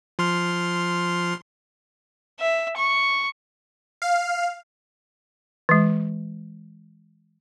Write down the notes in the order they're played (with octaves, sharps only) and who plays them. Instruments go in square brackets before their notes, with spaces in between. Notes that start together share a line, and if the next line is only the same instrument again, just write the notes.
[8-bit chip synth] F3 C6 F6
[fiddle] E5
C#6
[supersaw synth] F5
[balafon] E3 G#3